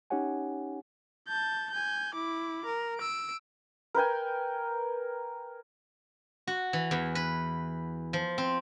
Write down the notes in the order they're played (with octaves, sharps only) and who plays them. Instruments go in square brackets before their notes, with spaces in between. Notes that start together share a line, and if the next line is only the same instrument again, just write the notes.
[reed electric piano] C#4 D#4 G4 C#5 F#5 G#5
[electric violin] A5 G6
G#5 G6
E4 D6
A#4
E6 D7
[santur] A#4 B4 G5 G#5
[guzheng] F#4
E3
E2
B4
F3
C4